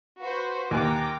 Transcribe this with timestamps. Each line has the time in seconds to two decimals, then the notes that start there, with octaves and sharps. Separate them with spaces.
0.20 F#4 B4 C5
0.71 D#2 G5 G#5 A#5 D6 F#6